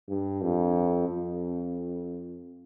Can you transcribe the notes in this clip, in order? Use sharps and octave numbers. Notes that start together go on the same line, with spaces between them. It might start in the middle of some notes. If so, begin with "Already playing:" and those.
G2
F2
F2